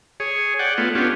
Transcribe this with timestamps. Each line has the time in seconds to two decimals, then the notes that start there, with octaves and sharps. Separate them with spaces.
0.20 G#4 C#5
0.59 D5 F#5 G5
0.78 A3 B3 F4
0.95 B3 C#4 D4 F4 G4